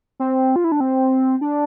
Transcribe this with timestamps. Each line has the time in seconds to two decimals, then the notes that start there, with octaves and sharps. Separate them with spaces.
0.20 C4
0.56 F4
0.64 E4
0.72 D4
0.80 C4
1.41 D4